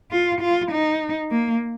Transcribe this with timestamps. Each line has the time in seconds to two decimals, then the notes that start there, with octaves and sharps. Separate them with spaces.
0.12 F4
0.41 F4
0.71 D#4
1.31 A#3